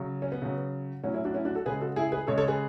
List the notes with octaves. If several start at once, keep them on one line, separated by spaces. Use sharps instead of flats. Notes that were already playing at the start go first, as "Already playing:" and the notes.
Already playing: C#3 F#3
C#4
B3
C#3 F#3
A2 F#3 C#4
C#4 E4
D4 F#4
C#4 E4
D4 F#4
F#4 A4
C#3 G#3 G#4 B4
F#4 A4
E4 G#4
G#4 B4
C#3 G#3 A4 C#5
A4 C#5
G#4 B4